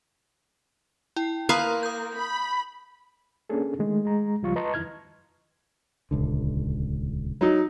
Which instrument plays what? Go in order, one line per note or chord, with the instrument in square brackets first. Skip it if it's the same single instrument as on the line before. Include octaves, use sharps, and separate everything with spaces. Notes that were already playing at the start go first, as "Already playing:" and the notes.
[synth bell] E4 G5
[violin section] A#3 [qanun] B4 F5 [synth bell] A#5 C6 D#6
[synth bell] D#6 G6
[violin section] B5
[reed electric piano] A#3 C#4 D4 G#4 A4
D#3 G#3 A3
G#3 A#5
C#2 F3 G3 F4 C#6
B4 D#5 A5 A#5 C6 C#6
F2 D#3 E4 F6 G#6
[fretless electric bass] D#1 C#2 D3
[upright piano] F#3 D#4